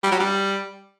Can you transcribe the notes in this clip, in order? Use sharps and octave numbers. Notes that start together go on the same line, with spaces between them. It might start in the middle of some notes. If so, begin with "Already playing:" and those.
G3
F#3
G3